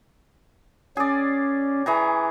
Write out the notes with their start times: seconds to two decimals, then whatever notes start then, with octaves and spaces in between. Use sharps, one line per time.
0.97 C#4 G#4 D5
1.86 E3 G#4 A#5